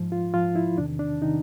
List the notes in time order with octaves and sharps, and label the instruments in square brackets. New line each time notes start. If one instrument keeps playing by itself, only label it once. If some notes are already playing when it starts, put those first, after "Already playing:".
Already playing: [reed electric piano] G#2 F3
F4
G#2 F3 F4
E4
E2 C3 D#3 D4
D4
C3 D#3 D#4